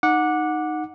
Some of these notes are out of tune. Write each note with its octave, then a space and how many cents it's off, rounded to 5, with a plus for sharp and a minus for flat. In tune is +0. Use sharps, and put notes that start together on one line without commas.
D#4 -10 F#5 -15 D6 +0